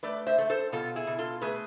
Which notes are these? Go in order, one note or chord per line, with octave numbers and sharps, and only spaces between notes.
A3 B4 D5
C5 E5
A3
A4 C5
B2 F4 A4
E4 G#4
B2
F4 A4
A3 G#4 B4